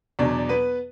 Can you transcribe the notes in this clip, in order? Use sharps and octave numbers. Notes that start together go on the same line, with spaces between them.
E2 B2 F#3 D4 D5
B3 B4